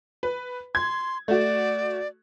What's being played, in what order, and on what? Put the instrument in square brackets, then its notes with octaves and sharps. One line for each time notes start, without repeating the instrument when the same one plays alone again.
[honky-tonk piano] B4
[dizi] C6 [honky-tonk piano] G#6
[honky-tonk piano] A3 F#4 [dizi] D5